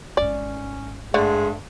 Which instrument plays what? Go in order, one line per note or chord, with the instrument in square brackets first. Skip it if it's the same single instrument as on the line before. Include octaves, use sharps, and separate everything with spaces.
[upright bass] G#1 G#2 [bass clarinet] C#4 [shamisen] D5
[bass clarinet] G2 [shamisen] D3 A3 [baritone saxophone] G#3